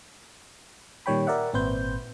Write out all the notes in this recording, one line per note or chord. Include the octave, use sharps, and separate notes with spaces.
A#2 D#3 G3 C#5 G5 B5
A#4 D5 E5 F#5
G#1 A#2 C4 B4 C5 G6